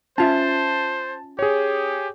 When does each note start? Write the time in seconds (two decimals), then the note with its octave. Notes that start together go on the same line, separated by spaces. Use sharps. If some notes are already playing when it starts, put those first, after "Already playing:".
0.18 C#4 F4 C5 E5 A5
1.39 G4 G#4 C#5